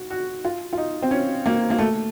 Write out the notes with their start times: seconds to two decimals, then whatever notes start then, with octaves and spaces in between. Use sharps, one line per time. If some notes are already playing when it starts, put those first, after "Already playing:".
Already playing: F#4
0.10 F#4
0.45 F4
0.73 F4
0.78 D#4
1.02 C4
1.11 C#4
1.46 A#3
1.70 A#3
1.78 A3